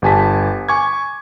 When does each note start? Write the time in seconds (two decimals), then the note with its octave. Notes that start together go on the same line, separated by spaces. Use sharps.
0.02 G1 G4 G#5 A5 B6
0.69 G#5 C#6 D6 G#6